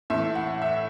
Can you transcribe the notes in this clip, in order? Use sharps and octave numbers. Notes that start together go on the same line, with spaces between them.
A2 E3 E5
F#5
E5